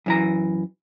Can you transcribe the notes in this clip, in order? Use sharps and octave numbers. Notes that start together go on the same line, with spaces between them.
F#2 E3 A#5